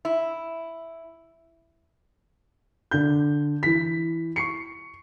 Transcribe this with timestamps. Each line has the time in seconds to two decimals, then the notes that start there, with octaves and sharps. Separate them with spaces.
0.05 E4
2.91 D3 G6
3.63 E3 B6
4.36 C#6 C7 C#7